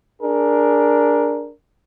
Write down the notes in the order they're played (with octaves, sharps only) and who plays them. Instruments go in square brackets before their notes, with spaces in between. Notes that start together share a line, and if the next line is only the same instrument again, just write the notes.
[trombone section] D4 G#4 A#4